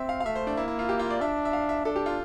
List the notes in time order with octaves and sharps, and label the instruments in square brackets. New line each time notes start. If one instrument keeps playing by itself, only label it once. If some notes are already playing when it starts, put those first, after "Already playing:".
Already playing: [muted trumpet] C4 [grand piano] E5
[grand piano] F5
F5
[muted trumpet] A3 [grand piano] E5
[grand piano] C5
D4
[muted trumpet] A#3 [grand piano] E4
[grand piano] E4
F4
G4
F4
D5
[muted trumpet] D4 [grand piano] E5
[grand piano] E5
F5
E5
[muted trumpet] D4 [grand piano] A4
[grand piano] G4
F4